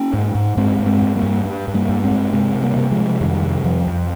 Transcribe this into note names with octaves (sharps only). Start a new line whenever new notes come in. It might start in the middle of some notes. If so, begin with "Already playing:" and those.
Already playing: A#3 C#4
G#2
G#2
G2 G#3 C4
G2
G#3 C4
G2
G3 A#3
G2
G2
G2
G3 A#3
G2
G#3 C4
G2
C3 G#3 C4
C3
G3 A#3
C3
F3 G#3
C3
F2 D#3 G3
C3
F2 F3
F2